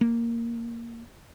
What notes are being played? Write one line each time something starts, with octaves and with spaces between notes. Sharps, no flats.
A#3